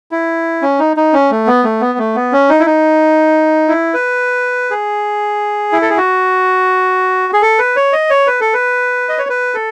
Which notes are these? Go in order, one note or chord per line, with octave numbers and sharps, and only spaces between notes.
E4
C#4
D#4
D#4
C#4
A3
B3
A3
B3
A3
B3
C#4
D#4
E4
D#4
E4
B4
G#4
E4
A4
G#4
F#4
G#4
A4
B4
C#5
D#5
C#5
B4
A4
B4
D#5
C#5
B4
A4